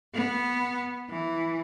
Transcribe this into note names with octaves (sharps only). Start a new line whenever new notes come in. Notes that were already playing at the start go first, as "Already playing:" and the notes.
B3
E3